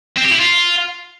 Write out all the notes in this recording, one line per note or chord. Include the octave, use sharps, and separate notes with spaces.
C4
G4
E4
F4